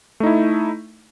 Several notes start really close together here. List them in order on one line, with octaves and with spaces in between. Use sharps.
A3 D#4 E4